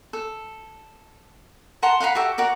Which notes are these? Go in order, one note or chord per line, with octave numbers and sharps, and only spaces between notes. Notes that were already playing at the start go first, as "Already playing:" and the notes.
A4
F#5 A5 A#5 C6
F5 F#5 A#5 B5
F#4 G4 A4 E5
F#4 A#4 D5